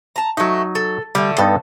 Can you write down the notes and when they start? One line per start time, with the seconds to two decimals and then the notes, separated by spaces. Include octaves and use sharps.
0.16 A5 A#5
0.37 F#3 A3 D#4 F#4
0.75 A4
1.15 D3 G3 A3
1.38 G2 B3 D#4 A4